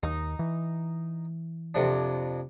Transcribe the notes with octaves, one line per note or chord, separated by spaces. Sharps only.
D#2 D#4
E3
F2 C3 D4